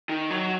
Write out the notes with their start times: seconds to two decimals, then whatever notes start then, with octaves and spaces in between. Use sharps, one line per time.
0.09 D#3
0.30 F#3